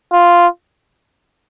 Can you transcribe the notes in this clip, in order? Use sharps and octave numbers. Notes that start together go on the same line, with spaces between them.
F4